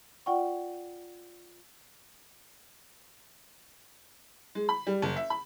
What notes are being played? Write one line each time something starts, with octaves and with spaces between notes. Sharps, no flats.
F4 D5 F#5 G5 C#6
G#3
B5
G3
F#1
E5
B5